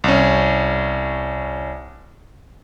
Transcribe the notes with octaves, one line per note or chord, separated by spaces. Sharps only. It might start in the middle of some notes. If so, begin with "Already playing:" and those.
C2 C#4